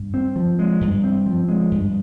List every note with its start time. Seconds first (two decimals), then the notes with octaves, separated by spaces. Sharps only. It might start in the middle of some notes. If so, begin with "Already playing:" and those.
Already playing: G2
0.14 C4
0.36 F3
0.59 G#3
0.81 G2
1.04 C4
1.26 F3
1.48 G#3
1.71 G2